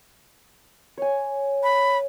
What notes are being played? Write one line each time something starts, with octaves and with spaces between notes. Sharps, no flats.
C#5 G#5
B5